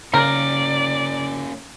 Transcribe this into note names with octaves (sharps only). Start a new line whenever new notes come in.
C#3 A#3 C#4 A#4 D5